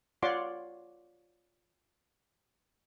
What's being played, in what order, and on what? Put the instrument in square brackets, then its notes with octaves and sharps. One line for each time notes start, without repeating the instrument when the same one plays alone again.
[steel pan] F4 C#5 D5 F#5 C6 D6